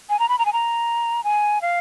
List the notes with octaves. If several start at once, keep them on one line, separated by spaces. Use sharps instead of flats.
G#5
A#5
B5
A#5
G#5
A#5
G#5
F5